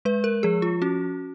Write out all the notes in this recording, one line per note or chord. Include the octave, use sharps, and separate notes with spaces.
G#3 B4
A#4
F3 G#4
F4
C#4 F#4